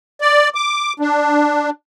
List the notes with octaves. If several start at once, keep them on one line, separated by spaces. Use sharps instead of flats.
D5
D6
D4